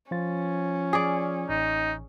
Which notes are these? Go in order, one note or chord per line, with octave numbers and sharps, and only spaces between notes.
F3 C#4 F4 A6
G#4 D5
A1 D#4